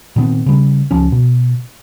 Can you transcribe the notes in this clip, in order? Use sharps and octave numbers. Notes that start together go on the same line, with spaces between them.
A#2 D#3 B3 C4
C#3 G3
C#2 F3 C#4
B2